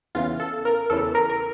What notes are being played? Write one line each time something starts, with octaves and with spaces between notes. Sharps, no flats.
E2 C#3 E3 F4
A4
A#4
E2 C#3 E3 A4
A#4
A#4